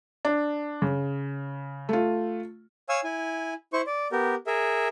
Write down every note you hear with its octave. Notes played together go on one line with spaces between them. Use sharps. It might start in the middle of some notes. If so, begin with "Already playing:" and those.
D4
C#3
A3 F4
C#5 F5 G#5 E6
E4 G#5
E4 C5 C#6
D5
B3 G4 A#4
G#4 A#4 E5